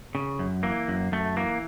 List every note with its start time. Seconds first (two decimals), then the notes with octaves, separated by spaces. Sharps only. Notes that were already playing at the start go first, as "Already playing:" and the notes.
0.15 C#3
0.39 F#2
0.63 E3 A#3
0.88 F#2
1.12 F#2 A3
1.36 E3 A#3